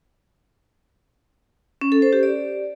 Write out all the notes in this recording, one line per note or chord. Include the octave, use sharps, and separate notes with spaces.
C#4
A4
C5
G4
D5